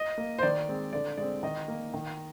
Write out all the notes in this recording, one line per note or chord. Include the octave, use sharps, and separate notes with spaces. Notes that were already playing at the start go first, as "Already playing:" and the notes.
Already playing: D#5
A#3
C5
D#3 D5
G#3 C4
D3 D5
G#3 C4 D5
D#3 D#5
A#3
D#3